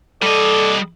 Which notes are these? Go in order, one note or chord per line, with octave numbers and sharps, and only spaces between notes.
G3 A4 D5 D#5